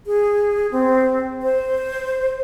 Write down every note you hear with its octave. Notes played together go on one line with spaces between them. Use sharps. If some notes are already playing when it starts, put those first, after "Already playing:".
G#4
C4
C5